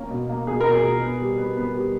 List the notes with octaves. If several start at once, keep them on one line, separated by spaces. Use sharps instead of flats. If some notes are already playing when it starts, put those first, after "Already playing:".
Already playing: A#3 C#4
B2
A#3
B2 G#4
B2 A#4
G#4
B2
B3
G3
B3
B3
G3